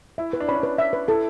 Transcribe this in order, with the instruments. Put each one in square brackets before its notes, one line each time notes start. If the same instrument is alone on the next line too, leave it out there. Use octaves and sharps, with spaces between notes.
[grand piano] E4 [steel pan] E5
[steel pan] B4
[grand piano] D4
[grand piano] C#4 [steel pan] B5
[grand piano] D4
[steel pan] B4
E5
B4
[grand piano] E4 [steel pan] A4